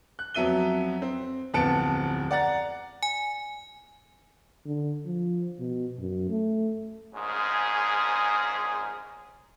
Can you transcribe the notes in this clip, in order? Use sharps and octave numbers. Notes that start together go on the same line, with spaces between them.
F#6
F2 F#3 B3 E5 D#7 G7
C4
D1 F2 B3 A5 C#7 D7
D5 F#5 A#5 A6
G#5
D3
F3
B2
F#2
A3
A#1 G#2 C#4 G#4